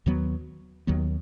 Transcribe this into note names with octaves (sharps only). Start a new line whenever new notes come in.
D#2 D#3 F#3 B3
D#2 D#3 F#3 B3